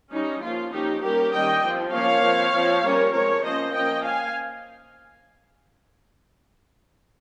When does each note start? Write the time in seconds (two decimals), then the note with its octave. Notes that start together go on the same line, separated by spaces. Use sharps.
0.12 G3 C#4 D#4
0.42 F3 A#3 C#4 F4
0.72 F3 A#3 C#4 D#4 G4
1.02 G3 A#3 C#4 G4 A#4
1.33 D#3 G3 A#3 C#4 D#5 G5
1.63 F3 C4
1.93 F3 A#3 C#4 C#5 F5
2.23 F3 C4
2.53 F3 C4
2.83 G3 A#3 C#4 A#4 C#5
3.14 F3 G#3 C4 A#4 C#5
3.44 F3 A#3 C#4 C5 D#5
3.73 F3 A#3 C#4 D#5 G5
4.04 F5 G#5